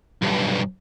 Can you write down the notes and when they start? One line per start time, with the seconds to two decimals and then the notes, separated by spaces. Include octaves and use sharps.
0.22 B1 G2